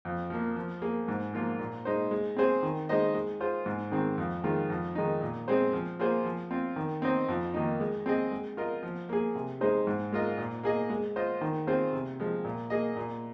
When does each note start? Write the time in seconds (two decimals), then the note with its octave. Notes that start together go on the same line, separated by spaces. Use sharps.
0.05 F2
0.30 F3 A#3
0.56 F3
0.82 A#3 G#4
1.08 G#2
1.33 F3 A#3 F4
1.59 A#2
1.85 G#3 D#4 C5
2.11 G#3
2.37 C4 G#4 C5
2.63 D#3
2.89 G#3 D#4 C5 D#5
3.14 G#3
3.40 F4 G#4 C5
3.66 G#2
3.92 D#3 G#3 C4
4.18 F2
4.44 D#3 G#3 F4
4.70 F2
4.95 D#3 G#3 D#4
5.21 A#2
5.48 G#3 C4 G#4 C5
5.73 F3
5.99 A#3 F4 G#4 C5
6.24 F3
6.51 C4 F4
6.76 D#3
7.02 C4 D#4 C5 D#5
7.28 F2
7.54 D#3 A#3 D#4
7.80 G#3
8.06 C4 G#4 D#5
8.31 G#3
8.57 F4 A#4 D#5
8.83 F3
9.09 A#3 G#4
9.35 C3
9.61 G#3 D#4 G#4 C5
9.87 G#2
10.12 G#3 F4 A#4 D#5
10.38 A#2
10.63 A#3 G#4 D#5
10.90 G#3
11.16 F4 C5 D#5
11.41 D#3
11.67 C4 F4 G#4 C5
11.93 C3
12.20 F3 G#3
12.45 A#2
12.70 A#3 G#4 D#5
12.96 A#2